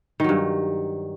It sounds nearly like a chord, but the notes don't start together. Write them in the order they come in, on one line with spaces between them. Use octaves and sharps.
D#3 F#3 G2